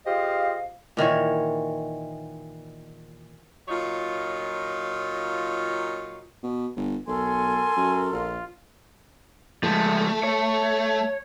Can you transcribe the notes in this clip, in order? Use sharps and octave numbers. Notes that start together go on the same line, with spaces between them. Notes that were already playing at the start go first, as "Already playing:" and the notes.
F4 G4 G#4 C5 D#5 F5
A#2 D#3 E3 C#5
A#2 F#3 D#4 F4 C#5
B2
G1
B1 A4 A#4 G#5 C6
F#2
A#1 F4
F3 G#3 A3
C#5